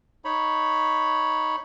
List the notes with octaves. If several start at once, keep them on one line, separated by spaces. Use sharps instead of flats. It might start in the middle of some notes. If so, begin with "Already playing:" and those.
D#4 C#5 B5